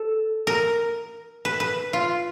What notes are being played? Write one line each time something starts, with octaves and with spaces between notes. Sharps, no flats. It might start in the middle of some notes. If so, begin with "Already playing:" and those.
Already playing: A4
A#4
B4
B4
F4